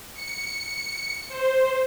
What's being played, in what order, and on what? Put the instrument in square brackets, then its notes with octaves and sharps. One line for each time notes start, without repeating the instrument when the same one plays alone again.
[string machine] C#7
C5